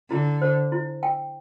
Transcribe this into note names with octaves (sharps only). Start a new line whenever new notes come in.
D3 E4
C5
E4
G5